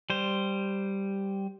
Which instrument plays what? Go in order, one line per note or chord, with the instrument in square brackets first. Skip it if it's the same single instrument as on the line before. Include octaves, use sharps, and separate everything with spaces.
[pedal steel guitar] G3 C5